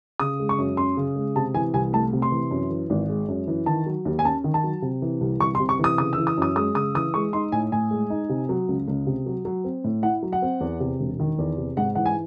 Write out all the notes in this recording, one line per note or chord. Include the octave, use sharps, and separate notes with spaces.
C#3 D#6
G#3
C#6
F#2
C#4 C6
C#3
G#3
C3 A5
E3 G#5
C2 G#5
A3 A5
C3
C6
E3
F#2
E3
G#1
G#3
F#2
E3
D#3 A5
F#3
D#2
G#5
C#4 A5
D#3
A5
F#3
C3
E3
C2
C2 C#6
C6
C3
C#6
E3 D#6
C#3 D#6
E6
E3
D#6
F#2 D#6
G#3 D#6
C#3 D#6
E3 D#6
G#3 C#6
D#4 C6
A2 G#5
A2 G#5
G#3
D#4
C3
F#3
C#2
C#2
C3
F#3
F#3
C4
A2
E4 F#5
F#3
F#5
C4
E2
C3
E1
D#3
E2
C3
G#2 F#5
E3 F#5
G#5